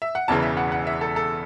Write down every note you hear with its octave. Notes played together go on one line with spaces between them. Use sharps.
E5
F#5
E1 E2 C#3 E3 A5
E5
F#5
F#5
E5
A4
A4